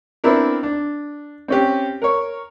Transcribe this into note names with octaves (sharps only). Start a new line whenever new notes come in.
B3 C4 D4 E4 A#4
D4
C4 C#4 G4
A#4 C#5